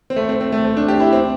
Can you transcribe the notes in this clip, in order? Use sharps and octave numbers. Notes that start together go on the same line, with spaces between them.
C4
A3
C4
C4
A3
C4
D4
G4
E4
C4